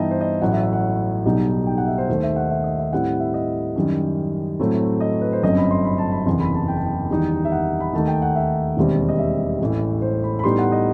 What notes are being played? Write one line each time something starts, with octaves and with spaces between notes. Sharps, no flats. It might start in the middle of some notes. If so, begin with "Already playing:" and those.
Already playing: G2 E3 B3 D#4 D#5 E5 G5 A5
C5
D#5
A1 A2 F#3 F#5
E5
E5
F#5
B1 B2 G3 D#4
G5
F#5
E5
C5
D#2 D#3 A3 C5
E5
F#5
E5
D#5
E5
A2 G3 C4 E4 F#5
E5
D#5
F#2 D#3 G3
A2 F#3 A3 C4
D#5
B4
C5
G1 F#2 F#3 C4 D#5
B5
C6
B5
A5
B5
F#1 E2 C3 C6
B5
A5
G5
A5
G5
E2 D#3 G3 D#4
E5
F#5
B5
D#2 D#3 A3 D#4 A5
G5
F#5
E5
E1 D#2 D#3 G3 C4
D#5
E5
A1 A2 E3
C5
B5
B5
A2 G3 B3 D#4 C6
F#5
D#5